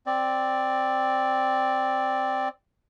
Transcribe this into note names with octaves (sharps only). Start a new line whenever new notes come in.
C4 D5